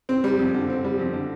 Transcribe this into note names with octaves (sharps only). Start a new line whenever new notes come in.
C4
G3
F2
D3
C4
G3
F2
D3